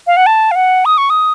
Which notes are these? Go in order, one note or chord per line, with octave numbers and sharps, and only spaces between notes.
F5
F#5
A5
F5
F#5
D#6
C#6
D#6